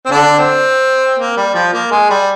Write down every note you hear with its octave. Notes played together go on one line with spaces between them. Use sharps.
C4
D3 D4
C4
A#3
G3
F3
A#3
G#3
G3